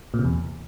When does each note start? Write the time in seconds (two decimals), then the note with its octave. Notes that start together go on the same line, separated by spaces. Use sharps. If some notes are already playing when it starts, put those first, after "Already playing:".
0.14 A#2
0.19 C3
0.24 E2